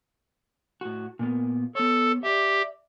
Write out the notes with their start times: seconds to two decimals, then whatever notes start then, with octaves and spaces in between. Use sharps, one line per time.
0.81 A2 F#4
1.19 A#2 A#3 B3
1.75 B3 A4 C#5
2.23 G4 D5 E5